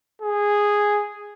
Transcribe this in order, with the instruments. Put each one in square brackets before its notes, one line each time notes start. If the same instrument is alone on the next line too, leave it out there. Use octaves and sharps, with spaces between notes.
[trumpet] G#4